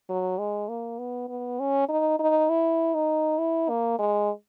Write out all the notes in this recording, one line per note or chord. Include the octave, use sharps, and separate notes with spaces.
F#3
G#3
A#3
B3
B3
C#4
D#4
D#4
E4
D#4
E4
A#3
G#3